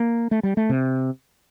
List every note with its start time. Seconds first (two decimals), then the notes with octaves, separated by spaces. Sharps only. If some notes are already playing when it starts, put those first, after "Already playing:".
Already playing: A#3
0.31 A3
0.43 G3
0.57 A3
0.69 C3